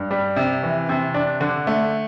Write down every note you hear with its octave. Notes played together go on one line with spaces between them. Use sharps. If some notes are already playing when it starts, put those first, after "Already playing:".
Already playing: G2
G3
C3
E3
C3
D4
D3
A3